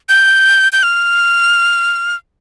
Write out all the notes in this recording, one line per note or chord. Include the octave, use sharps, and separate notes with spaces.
G6
G6
F6